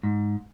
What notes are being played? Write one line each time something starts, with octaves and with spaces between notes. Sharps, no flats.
G#2